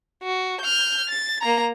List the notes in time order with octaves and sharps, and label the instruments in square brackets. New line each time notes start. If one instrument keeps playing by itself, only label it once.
[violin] F#4
F6 G6
A6
A#3 A#5